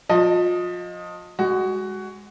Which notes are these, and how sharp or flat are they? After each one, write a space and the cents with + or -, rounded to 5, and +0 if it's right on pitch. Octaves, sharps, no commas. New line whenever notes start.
F3 +30 D#5 +0
G#3 -10 F#4 +15